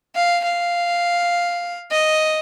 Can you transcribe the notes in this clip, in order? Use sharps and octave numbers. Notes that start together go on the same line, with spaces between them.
F5
F5
D#5